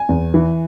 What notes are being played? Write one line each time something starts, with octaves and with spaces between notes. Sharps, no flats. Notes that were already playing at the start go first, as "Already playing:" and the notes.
Already playing: G#5
E2
E3